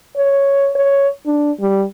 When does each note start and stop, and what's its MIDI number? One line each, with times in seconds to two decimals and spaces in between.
0.17 0.70 73
0.75 1.08 73
1.26 1.51 62
1.60 1.83 55